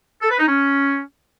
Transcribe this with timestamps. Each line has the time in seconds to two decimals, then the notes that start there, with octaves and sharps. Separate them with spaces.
0.22 A4
0.30 B4
0.39 D#4
0.48 C#4